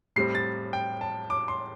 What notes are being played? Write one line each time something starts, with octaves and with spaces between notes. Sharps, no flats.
A2 G3 C4 C7
A6
G5
A5
D6
C6